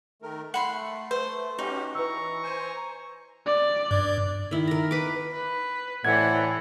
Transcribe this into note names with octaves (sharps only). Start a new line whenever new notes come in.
D#3 A3 A#4
A3 F#5 B5 C6
B4 C5
C#4 D#4 F#4 G4
E3 B4 A#5 C#6 E6
C5 G#5
D5
G2
D#3 E4
A#4 A#5
B4 D6
B4
A2 E3 C5 D5 F#5 G#6